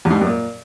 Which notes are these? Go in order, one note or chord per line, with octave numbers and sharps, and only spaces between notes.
E2
G#2
G3
F#2
A#2